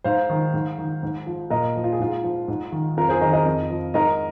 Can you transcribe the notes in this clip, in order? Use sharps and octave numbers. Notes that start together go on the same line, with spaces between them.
G#2 C5 F5
D#3
G#2
D#3
G#2
F3
A#2 A#4 D#5
F3
F4
G#4
G#2 F4
F3
G#2
D#3
F2 F4 A#4
G#4 C5
D#3 A#4 D#5
A#4 D#5
F2
F3
G#2 A#4 D#5